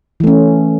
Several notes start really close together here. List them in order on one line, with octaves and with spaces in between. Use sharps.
E3 A3 C#4